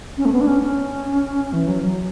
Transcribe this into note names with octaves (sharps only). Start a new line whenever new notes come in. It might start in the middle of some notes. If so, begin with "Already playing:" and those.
C#4
A3
B3
D4
C#4
C#4
E3
F#3
F#3